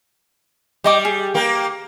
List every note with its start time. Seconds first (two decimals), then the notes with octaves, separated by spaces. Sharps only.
0.84 G3 G4 D#5 D6
1.05 G#4
1.34 A#3 G4